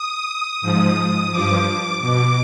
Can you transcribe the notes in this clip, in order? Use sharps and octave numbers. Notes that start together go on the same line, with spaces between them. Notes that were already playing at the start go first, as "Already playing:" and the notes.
Already playing: D#6
G#2 F3 D#6
G2 F3 D6
B2 D6